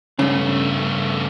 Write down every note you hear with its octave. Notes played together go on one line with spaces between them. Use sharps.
G2 C#3 A3 B3